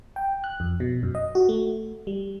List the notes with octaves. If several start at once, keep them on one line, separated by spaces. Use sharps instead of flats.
G5
F#6
F2
B2
F#2
D#5
F#4
A3
G3